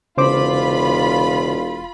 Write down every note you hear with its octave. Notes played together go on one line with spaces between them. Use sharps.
E1 C#3 F4 C5 B5 D6